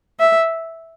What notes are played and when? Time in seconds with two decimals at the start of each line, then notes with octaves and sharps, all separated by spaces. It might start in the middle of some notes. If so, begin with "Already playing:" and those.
0.19 E5